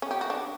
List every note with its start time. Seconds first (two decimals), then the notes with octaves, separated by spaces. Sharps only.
0.02 C#4
0.11 G4
0.21 F#4
0.30 D4